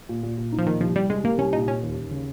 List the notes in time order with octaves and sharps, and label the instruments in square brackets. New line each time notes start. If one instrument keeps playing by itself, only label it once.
[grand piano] A#2
A#2
A#2
D#4
[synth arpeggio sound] F3
[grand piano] A#2 [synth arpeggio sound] D#3
[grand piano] C2 [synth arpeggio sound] F3
[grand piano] C2 [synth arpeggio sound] G3
[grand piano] C2 [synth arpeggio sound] G#3
[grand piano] C2 [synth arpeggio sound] A#3
[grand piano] C2 [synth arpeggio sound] C#4
[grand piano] A#2 [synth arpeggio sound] D#4
[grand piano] A#2 [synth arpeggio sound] C#4
[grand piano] D#2
D#2
C#3